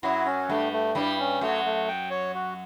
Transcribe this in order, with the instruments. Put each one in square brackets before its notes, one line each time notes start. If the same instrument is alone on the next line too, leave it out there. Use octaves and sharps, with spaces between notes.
[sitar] F#2 F#3 [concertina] E4
[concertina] C#4
[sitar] G2 G3 [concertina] A3
[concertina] A3
[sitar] G2 G3 [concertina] E4
[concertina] C#4
[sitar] F#2 F#3 [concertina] A3
[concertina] A3
G5
C#5
F#4